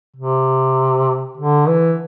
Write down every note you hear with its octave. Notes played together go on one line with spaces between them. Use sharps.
C3
D3
E3